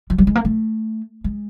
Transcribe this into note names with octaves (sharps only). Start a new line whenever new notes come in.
F3
G3
G#3
A#3
A3
G#3